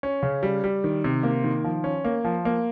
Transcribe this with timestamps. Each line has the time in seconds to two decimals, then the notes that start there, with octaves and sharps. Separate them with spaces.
0.03 C#4
0.23 C#3
0.43 G3
0.64 G3
0.84 D#3
1.04 C3
1.23 A#3
1.44 D#3
1.64 F3
1.84 C#4
2.05 A#3
2.24 F3
2.45 A#3